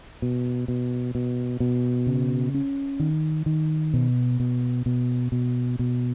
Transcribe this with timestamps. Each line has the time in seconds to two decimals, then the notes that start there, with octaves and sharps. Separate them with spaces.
0.22 B2
0.68 B2
1.15 B2
1.60 B2
2.07 C#3
2.54 C#4
3.00 D#3
3.46 D#3
3.94 B2
4.40 B2
4.86 B2
5.32 B2
5.79 B2